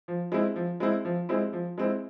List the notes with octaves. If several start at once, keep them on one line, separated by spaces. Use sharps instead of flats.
F3
G#3 C4 E4
F3
G#3 C4 E4
F3
G#3 C4 E4
F3
G#3 C4 E4